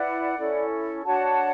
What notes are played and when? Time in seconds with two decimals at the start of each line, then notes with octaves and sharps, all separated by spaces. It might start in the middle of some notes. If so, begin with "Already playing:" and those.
Already playing: E4 B4 D5 F#5
0.37 C#4 E4 A4
1.05 D4 F#4 C#5 F#5 A5